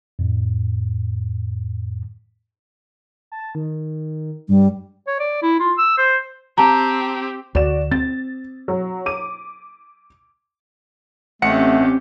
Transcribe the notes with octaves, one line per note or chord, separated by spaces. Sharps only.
F2 A2
A5
D#3
G2 G3
C#5
D5
E4
F4
E6
C5
C4 G4 A5 A#5
D2 F#4 D5 E7
C4 A6
F#3
D6 D#7
A1 A3 C4 C#4 G4 F#5 C#7